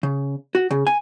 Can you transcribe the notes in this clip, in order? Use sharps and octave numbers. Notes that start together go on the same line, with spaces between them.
C#3
F#4
C#3
G#5